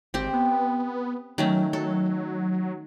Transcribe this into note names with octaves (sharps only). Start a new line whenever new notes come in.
G#1 C4 G4
B3
D#3 F#3 A3 C#4
F#3 A4